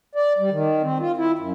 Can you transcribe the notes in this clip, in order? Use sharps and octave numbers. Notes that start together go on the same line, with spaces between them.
D5
G3
D#3
C4
F4
E4
F#2